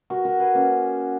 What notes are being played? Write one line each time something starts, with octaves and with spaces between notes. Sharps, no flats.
F#4 A#4
F#4 A#4
G#4 B4
A#3 C#4